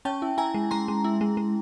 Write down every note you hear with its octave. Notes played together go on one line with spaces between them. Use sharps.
C#4 G5 A5
E4
E4 G#5 A#5
G#3
G#3 A#5 C6
G#3
E4
G#3
G#3